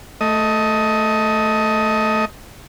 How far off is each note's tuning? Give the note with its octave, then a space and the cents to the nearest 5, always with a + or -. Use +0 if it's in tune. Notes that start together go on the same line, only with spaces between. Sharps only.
A3 +0 D#5 +15